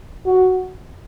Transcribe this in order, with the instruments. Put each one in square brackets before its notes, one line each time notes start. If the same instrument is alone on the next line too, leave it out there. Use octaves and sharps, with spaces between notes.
[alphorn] F#4